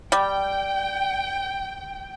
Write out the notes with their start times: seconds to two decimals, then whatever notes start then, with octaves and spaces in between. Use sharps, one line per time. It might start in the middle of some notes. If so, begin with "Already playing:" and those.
0.12 G3 G5